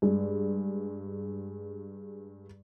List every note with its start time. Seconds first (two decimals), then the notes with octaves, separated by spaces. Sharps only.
0.02 G2 G#3